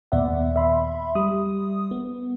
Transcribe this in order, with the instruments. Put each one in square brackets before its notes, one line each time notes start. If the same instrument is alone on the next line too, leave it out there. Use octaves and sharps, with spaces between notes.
[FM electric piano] D#2 A#2 B3 D5 E5 F#5
E5 B5 C6
G3 D#6
B3